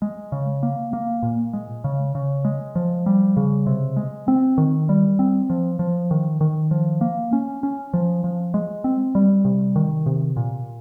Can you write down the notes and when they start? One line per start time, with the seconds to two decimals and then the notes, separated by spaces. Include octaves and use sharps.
0.02 G#3
0.32 C#3
0.63 A#3
0.93 A#3
1.23 A#2
1.53 G#3
1.84 C#3
2.15 C#3
2.45 G#3
2.75 F3
3.06 G3
3.37 C#3
3.67 C3
3.97 G#3
4.28 C4
4.58 D#3
4.89 G3
5.19 C4
5.50 F3
5.79 F3
6.11 D#3
6.41 D#3
6.71 F3
7.01 A#3
7.33 C#4
7.63 C#4
7.94 F3
8.24 F3
8.54 G#3
8.84 C4
9.15 G3
9.45 C3
9.76 D#3
10.06 C3
10.37 A#2